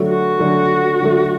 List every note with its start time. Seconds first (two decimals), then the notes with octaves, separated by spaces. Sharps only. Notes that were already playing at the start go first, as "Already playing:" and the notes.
Already playing: D3 F#3 A3
0.09 F#4
0.39 D3 F#3 A3
1.00 D3 F#3 A3